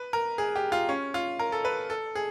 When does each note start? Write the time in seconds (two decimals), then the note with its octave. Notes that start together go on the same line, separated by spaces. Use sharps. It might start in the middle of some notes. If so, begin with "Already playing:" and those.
Already playing: B4
0.13 A#4
0.38 G#4
0.56 G4
0.72 F4
0.89 C#4
1.14 F4
1.39 A#4
1.52 A4
1.65 B4
1.90 A4
2.15 G#4